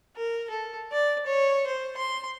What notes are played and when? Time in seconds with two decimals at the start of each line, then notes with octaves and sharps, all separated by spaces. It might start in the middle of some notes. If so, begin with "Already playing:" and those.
0.16 A#4
0.50 A4
0.92 D5
1.26 C#5
1.67 C5
1.97 C6